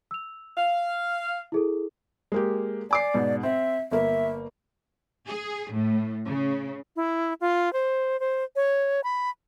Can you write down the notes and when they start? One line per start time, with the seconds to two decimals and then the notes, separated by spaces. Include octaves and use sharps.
0.11 E6 F7
0.57 F5
1.52 E4 G#4 A4
2.32 G#3 A#3 G4
2.91 D5 G#5 D6 C7
3.14 G#2 B2
3.43 C4 E5
3.92 G1 A#3 E5
5.27 G#4
5.71 A2
6.26 C#3
6.96 E4
7.41 F4
7.73 C5
8.20 C5
8.56 C#5
9.04 B5